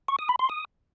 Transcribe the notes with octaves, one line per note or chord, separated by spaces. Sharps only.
C#6
D#6
B5
C6
D#6